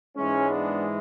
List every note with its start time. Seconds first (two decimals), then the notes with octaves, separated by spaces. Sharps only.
0.16 G#2 E3 G#3 C#4
0.49 B3 D4